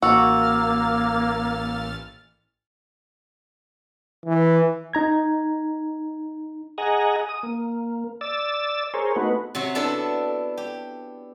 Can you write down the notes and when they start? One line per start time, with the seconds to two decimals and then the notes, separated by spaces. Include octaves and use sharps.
0.02 A1 A#3 F#4 E6 F6 A6
4.26 E3
4.93 D#4 A#5 G#6
6.78 G#4 D#5 F#5 G#5 A#5
7.29 D#6
7.43 A#3
8.21 D5 E6 A6
8.94 G#4 A#4 C5 C#5
9.16 A3 B3 D#4 F#4 B4
9.55 C3 F#3 F#4
9.75 B3 D4 E4 A4
10.57 G4